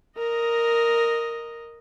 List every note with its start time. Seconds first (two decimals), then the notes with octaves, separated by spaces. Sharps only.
0.18 A#4 D#5